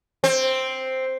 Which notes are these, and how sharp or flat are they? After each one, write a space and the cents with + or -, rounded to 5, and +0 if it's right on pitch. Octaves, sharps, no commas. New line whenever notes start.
C4 +0